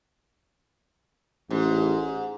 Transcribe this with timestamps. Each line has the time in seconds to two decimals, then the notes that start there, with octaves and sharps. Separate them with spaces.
1.50 A1 G#2